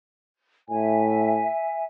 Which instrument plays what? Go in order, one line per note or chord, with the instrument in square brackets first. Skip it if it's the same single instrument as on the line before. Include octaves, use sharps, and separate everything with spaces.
[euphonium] A2 [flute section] E5 G#5